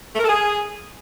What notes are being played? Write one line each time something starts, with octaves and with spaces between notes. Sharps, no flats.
A3
A#4
A4
G#4